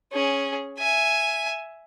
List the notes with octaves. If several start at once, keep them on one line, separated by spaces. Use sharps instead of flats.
C#4 G#4
E5 G#5